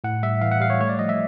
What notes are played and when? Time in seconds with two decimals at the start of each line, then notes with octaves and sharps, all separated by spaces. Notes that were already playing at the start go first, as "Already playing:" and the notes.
0.04 A2 F#5
0.23 G3 E5
0.42 E3 F5
0.51 F#5
0.60 G3 F5
0.70 C#5
0.80 A3 C#5
0.89 D5
0.99 F3 D#5
1.09 E5